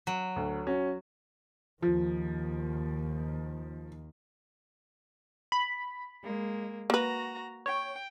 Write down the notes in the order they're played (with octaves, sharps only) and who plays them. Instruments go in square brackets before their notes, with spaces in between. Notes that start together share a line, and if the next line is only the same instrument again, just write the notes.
[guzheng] F#3
[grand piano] D2
C#4 F#4
[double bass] D#2 D#3 [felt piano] F3
[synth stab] B5
[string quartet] G#3 A#3
[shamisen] A#3 B4 [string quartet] F#4 A#5
[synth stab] C#5 [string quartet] G5